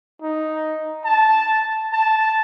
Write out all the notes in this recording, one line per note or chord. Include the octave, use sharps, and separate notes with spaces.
D#4
A5
A5